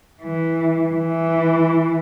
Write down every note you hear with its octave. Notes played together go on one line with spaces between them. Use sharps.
E3
E3